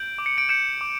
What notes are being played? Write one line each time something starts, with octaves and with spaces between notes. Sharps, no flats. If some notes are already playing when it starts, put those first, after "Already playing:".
Already playing: G6 D7 F#7
D6
C#7
D7
G6 C#7 E7
D6